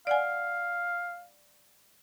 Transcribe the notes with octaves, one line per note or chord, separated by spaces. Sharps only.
D5 F5 F#5 G#5